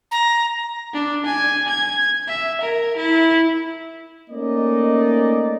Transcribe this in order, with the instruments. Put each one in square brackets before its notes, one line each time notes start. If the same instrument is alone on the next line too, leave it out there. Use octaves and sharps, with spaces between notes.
[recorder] A#5
[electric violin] D4
G#5
G#6
E5
A#4
E4
[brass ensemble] A3 A#3 C#4 D#4 D5 D#5